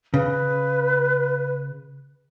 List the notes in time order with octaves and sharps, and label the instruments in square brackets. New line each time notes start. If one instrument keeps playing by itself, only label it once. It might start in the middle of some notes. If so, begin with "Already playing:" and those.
[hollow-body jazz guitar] C#3 [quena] B4